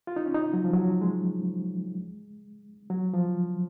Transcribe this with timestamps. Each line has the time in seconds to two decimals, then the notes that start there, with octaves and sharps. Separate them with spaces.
0.07 F4
0.16 D#4
0.26 C#4
0.35 D#4
0.53 F#3
0.64 F3
0.73 F#3
1.02 G#3
2.90 F#3
3.14 F3